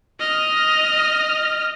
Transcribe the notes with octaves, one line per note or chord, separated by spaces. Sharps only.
D#5 F6